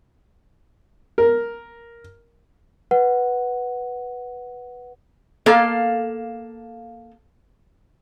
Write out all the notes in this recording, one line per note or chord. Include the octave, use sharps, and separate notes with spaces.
A#4
B4 F#5
A#3 A4 F5